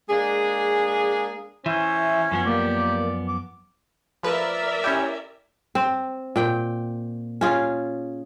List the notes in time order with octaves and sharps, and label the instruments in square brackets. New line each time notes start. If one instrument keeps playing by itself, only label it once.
[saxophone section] G#3 A#3 D4 G#4
[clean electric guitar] E3 [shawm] C#4 [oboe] C5 [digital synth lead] E5
[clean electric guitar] F#2 F3 B3
[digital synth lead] A#3 [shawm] G4 [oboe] D5
[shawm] D6
[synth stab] F3 B4 [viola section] A#4 D5 E5
[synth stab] C#4 E4 G4
[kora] C4
A#2 G5
C#4 F4 G#4